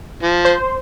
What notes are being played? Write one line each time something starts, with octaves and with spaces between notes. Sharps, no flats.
F3
C5